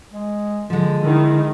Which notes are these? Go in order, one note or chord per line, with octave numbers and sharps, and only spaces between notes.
G#3
D3 F3 G#3
D3 D#3 E4